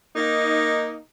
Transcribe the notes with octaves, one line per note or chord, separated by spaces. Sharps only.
A#3 D#4